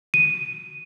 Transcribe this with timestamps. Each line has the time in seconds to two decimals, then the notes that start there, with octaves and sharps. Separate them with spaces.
0.14 D#7